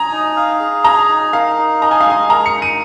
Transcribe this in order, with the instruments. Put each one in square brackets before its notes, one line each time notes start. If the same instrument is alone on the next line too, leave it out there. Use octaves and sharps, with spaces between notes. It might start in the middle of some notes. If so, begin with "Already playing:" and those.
Already playing: [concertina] G#5 [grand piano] A#5 D#6
[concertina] D#4
F5
G#4
[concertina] G#5 [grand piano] A#5
[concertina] D#4
[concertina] A#4 [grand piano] F5
[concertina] D#4
[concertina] D#5 [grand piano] A#5
[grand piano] G#5
F5
[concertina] G#3 [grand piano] G#5
[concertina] A#4 [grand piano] A#5
[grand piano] C#7
[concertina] D#4
[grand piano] D#7